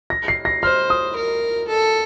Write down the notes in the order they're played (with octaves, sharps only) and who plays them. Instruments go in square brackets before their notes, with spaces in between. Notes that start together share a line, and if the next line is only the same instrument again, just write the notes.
[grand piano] A#6
C7
A#6
[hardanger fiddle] C5 [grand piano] F6
[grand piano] D#6
[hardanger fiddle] A#4
A4